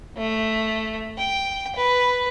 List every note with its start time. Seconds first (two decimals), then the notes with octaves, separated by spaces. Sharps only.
0.17 A3
1.18 G5
1.75 B4